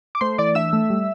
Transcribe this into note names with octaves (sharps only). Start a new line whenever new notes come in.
D6
A3 C5 C6
E3 D5 D6
D4 E5 E6
A3
G3